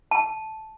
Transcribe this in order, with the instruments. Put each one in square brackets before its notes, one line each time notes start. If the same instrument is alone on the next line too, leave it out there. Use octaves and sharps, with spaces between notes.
[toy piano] A5